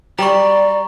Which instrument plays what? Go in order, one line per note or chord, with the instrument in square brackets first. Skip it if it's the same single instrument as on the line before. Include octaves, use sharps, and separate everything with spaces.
[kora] G3 [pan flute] D5 [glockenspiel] A#5 C#6